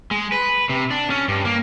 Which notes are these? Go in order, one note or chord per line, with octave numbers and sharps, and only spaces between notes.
G#3
B4
C3
D4
C#4
G2
A#3